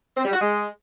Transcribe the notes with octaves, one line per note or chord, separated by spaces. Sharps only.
C4
G3
F#4
G#3